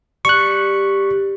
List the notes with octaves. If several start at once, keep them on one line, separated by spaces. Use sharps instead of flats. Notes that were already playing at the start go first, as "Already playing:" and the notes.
G3 C#6 F#6